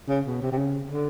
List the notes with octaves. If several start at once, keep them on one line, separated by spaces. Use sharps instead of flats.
C#3
B2
C3
C3
C#3
D3